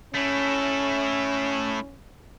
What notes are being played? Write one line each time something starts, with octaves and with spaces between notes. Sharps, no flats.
A3 C#4 E4